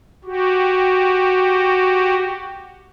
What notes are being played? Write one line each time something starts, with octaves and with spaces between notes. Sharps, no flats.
F#4 G4